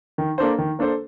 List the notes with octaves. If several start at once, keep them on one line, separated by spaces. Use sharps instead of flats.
D#3
A#3 D4 A4 C5
D#3
A#3 D4 A4 C5